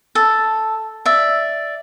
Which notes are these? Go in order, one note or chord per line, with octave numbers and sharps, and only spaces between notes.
A4
D5 E5